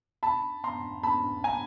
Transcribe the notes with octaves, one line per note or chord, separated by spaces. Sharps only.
A5 B5
A#5 C6
A5 B5
G#5 A#5